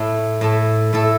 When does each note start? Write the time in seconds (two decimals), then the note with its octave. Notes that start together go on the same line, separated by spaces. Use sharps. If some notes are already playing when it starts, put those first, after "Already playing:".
Already playing: A2 A3 E4 A4
0.41 A2 A3 E4 A4
0.93 A2 A3 E4 A4